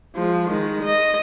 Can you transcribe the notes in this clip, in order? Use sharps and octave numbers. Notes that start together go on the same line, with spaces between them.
F3 G#3
D#3 G#3
D#5